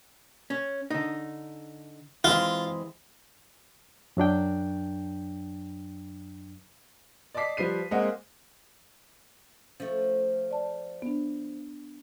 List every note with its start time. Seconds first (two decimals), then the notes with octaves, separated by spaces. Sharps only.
0.50 C#4
0.90 D3 D#4
2.24 E3 G#3 C4 F4
4.17 F#2 F#3 D4 G5
7.35 D5 D#5 A5 D6 B6 C7
7.57 F3 G3 B4 C7 D#7
7.91 G#3 A#3 C4 A#4 D#5 F#5
9.80 F3 A3 C#4
10.51 D5 A5
11.02 B3 D4